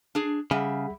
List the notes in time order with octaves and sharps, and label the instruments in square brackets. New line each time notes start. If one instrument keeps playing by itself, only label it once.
[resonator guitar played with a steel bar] D4 G#4
[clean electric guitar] C#3 [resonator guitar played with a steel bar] G3 E5 [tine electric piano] G#4 F#5